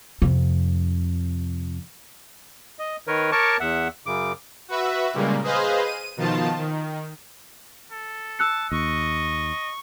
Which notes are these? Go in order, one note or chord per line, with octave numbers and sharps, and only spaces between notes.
F2 C3
D#5
D#3 A#4 B4 C#5
A#4 C#5 A5 C#6 D6
E2 E5 F#5
F#2 C#3 D6
F#4 B4 E5
A#2 C#3 G3 G#3 A#3
G#4 B4 C5 D#5 F5
D#7
B2 D#3 F3 F4 A5
D#3
A4
A5 E6 F#6 C#7
D#2 D#5 C#6